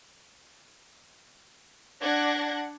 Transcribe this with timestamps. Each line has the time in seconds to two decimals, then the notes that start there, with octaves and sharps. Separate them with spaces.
2.02 D4 D5 F#5 F#6 G#6 A#6